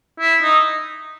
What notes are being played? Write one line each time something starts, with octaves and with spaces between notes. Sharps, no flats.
E4
D#4